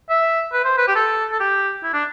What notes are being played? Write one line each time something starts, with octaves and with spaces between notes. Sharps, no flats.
E5
B4
C5
B4
G4
A4
A4
G4
E4
D4